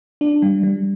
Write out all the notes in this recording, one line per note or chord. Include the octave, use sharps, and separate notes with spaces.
D4
G3
G3